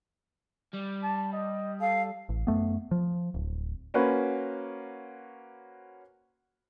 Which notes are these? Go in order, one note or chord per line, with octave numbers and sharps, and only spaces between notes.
G3
A5
D#5
A4 F5
A1
F#2 A3 B3
F3
D1
A#3 C#4 F#4 B4 C5